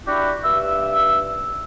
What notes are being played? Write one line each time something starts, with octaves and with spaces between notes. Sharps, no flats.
D4 E4 F#4 G4
G2 E5 E6